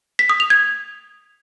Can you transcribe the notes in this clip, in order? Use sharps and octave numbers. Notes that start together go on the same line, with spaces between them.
B6
D#6
F7
G#6